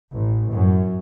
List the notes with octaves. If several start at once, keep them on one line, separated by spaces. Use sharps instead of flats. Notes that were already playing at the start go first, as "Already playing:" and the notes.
A1
F#2